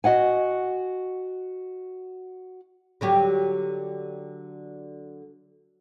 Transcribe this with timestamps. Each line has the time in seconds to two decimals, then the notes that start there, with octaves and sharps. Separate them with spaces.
0.04 F#4 D#5 F#5 G#5
3.01 D3 F#3 G4